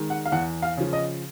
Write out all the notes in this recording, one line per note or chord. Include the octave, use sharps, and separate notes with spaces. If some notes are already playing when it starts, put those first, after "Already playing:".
Already playing: D#3 G#3
F#5
F5
E2 F#5
F5
C#3 F3
D#5